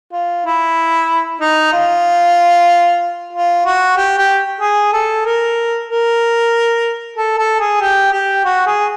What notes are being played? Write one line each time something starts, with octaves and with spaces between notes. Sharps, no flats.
F4
E4
D#4
F4
F4
F#4
G4
G4
G#4
A4
A#4
A#4
A4
A4
G#4
G4
G4
F#4
G#4